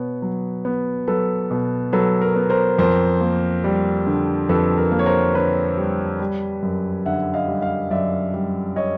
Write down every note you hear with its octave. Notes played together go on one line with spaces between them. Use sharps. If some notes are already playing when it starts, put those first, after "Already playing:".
Already playing: B2 B3 B4 C#5
F#3
B3
F#3 A4 B4
B2
F#3 A4 B4
A#4
B3
A#4 C5
F2 A#4 C5
A#3
G3
D3
F2 A4 B4
A#4
A#3
C#5
A#4 C5
D3 B4 C#5
G3
G3
F#2
D3 E5 F#5
D#5 F5
G3
D#5 F5
F#2 D5 E5
G3
C#5 D#5